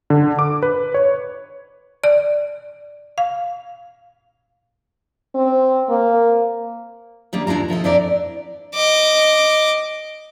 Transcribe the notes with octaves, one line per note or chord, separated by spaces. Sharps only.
D3
D6
B4
C#5
D5
F5
C4
A#3
D#3 G3 A#3 D4
D#2 D4 E4 F4 A#5
B2 F3 A4 D#5
F2 D4 E4 D5 A#5
D#5 D6